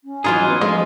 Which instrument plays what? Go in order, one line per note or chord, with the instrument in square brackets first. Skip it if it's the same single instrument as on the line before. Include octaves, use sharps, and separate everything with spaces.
[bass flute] C#4
[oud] E3 F#3 D#4 [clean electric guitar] F4 G#4
[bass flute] B3
[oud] F3 [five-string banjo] G#3 [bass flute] A3